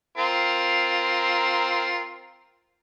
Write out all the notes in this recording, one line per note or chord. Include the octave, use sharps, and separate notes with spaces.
C4 F4 A#4